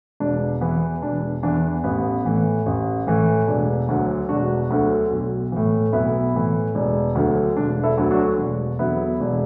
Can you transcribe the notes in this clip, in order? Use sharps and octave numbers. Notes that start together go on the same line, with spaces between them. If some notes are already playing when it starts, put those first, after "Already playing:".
E1 D4
E2 E3 B3
E1 D4
E2 E3 D4
A1 B3
A2 E3
A1
A2 E3
E1 D4
D2 D3 F#3
E1 D4 F#4
D2 D3 F#3
B1
A2 E3
B1 B3 E4
A2 E3
E1
D2 D3 F#3
E1 D4
E4 A4
D2 D3 F#3
D4 F#4
E1
E2 D3 F#3 B3 E4
E1